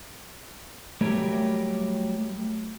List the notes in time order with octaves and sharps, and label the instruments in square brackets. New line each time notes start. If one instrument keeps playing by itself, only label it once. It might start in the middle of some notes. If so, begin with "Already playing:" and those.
[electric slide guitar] F#3 G3 A3 G4 A#4 C#5